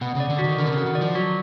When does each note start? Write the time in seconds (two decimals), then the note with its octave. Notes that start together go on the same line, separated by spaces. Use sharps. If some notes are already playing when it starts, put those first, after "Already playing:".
0.01 B2 F#5
0.15 C#3
0.20 D5
0.30 D3
0.39 F#4
0.44 D#3
0.58 D3 A#4
0.66 C3
0.72 C#3
0.78 F#5
0.86 D#3
0.95 D5
1.01 F3
1.15 F#3 F#4